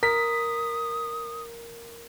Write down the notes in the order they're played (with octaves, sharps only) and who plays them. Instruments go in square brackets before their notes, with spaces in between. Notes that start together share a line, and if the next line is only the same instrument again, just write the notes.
[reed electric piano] A#4 [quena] D#6 [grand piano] B6